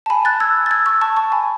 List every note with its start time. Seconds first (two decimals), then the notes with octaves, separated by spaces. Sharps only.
0.06 A5
0.10 G#5 B5
0.25 F#6 A6
0.40 E6 G#6
0.66 A6
0.71 E6 G#6
0.86 C#6 E6
1.01 A5 C#6
1.16 A5 C#6
1.32 G#5 B5